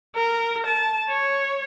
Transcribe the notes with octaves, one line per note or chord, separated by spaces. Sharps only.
A#4
A5
C#5